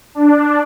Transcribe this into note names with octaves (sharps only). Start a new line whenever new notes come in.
D4